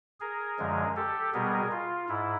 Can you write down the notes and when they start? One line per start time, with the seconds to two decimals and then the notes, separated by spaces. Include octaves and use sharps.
0.20 G#4 A#4
0.59 F#2 D3 F3 G#3
0.96 G4 A4
1.34 B2 G3 B3 G#4 A#4
1.71 F4
2.09 G#2 E4